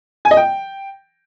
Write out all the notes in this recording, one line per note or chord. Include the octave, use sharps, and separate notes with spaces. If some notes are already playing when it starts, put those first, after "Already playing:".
G#5
D#5
G5